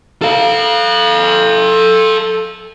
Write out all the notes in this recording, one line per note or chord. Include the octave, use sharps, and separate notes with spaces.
A4 F5